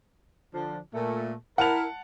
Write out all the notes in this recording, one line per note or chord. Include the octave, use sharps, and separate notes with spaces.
D3 F3 D4
A#2 A3
E4 A#4 F#5 A5 F7